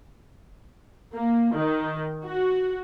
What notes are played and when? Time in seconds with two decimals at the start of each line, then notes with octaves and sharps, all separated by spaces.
1.13 A#3
1.55 D#3
2.25 F#4